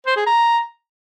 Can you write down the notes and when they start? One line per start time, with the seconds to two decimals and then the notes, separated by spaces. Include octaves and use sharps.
0.06 C5
0.16 G#4
0.26 A#5